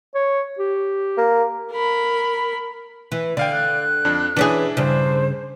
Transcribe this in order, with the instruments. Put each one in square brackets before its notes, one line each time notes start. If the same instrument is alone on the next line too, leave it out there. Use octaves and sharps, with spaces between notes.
[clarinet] C#5
G4
[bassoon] A#3
[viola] A#4 B5
[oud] E3
[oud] D3 [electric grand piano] D5 F5 G5
[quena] F#6
[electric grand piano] F2 D4
[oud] E3 C#4 G#4 [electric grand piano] D4 E4
[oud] G2 C#3 [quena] C5